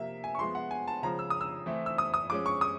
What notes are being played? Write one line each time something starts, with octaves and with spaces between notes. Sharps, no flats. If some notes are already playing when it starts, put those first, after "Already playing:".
Already playing: C3 F3 A#3 E5
G#5
C#6
F3 G#3 B3 C6
F#5
G#5
A5
C#3 F3 G#3 A#5
E6
D#6
E6
E3 A3 C4
E6
D#6
D#6
F3 G#3 C#4 D6
C#6
D#6